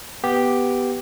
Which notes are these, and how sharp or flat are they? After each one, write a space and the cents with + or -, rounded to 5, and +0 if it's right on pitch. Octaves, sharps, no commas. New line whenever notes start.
B3 +0 G4 +0